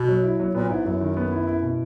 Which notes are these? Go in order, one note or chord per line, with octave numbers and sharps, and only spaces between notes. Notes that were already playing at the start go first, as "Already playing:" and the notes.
Already playing: B2
F#3
E4
F#3
A#2 B3
G#2 E4
F#2 F#3
D#3
B3
E4
E4
B2